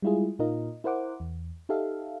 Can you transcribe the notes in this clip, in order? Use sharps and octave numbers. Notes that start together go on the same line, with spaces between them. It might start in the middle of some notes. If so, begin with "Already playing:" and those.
G3 G#3 E4 F4 G#4
A#2 D#4 F4 A#4 D#5
E4 A#4 C5 F#5 D6
E2
D#4 G4 A4 E5 F5